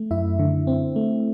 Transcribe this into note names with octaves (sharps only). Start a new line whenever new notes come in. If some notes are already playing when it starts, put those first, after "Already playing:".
Already playing: A3
F#2 E4 E5
D3
C4
A3